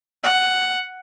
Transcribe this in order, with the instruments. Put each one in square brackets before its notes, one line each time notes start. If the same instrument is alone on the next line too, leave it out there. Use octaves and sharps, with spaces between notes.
[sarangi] F#5